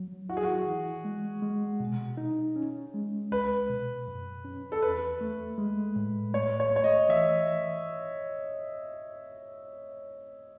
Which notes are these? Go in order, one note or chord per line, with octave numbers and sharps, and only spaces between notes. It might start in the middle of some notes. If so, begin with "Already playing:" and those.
Already playing: F#3
E4 F#4
G#4
F#4
E3
G#3
G#3
B2
D#4
C#4
G#3
C#2 B4
B2
F#2
C#4
A4
E2 B4
A3
G#3
A2
A3 C#5
C#5
A3 C#5
D#5
E3 E5